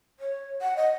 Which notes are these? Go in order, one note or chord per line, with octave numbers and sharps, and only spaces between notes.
C#5
F#5
D#5